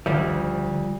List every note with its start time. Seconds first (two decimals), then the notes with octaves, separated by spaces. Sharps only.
0.06 D2 F3 G3